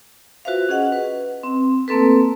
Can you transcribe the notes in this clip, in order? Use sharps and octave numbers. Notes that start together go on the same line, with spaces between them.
F4 F#4 B4 C5 E5 F5
C#4 G#4 D#5 F#5
B4
C4
A3 A#3 C4 A4 B4